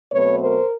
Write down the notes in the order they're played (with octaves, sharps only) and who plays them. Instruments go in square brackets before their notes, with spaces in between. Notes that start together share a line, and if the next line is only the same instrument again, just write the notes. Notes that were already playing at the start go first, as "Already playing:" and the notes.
[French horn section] B2 F#3 A3 C4 B4 C#5
A#4 C5